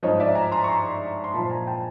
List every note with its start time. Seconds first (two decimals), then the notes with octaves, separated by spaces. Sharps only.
0.03 G#2 F3 C#5 D#5
0.20 D5 E5
0.35 G#5 A#5
0.52 A#5 C6
0.64 C#6
0.68 A#5 C6
1.24 C6
1.34 A#2 A5 B5
1.38 F3
1.50 G#5 A#5
1.67 G5 A5